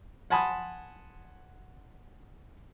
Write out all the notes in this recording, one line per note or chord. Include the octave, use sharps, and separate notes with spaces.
F#5 G#5 A5 B5 C6 D#6